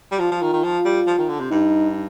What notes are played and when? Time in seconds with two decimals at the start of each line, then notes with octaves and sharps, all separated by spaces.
0.11 G3
0.20 F3 F4
0.32 F3
0.42 D#3
0.53 D#3
0.64 F3
0.85 G3
1.07 F3
1.18 D#3
1.29 D3
1.40 C3
1.51 G2 D#4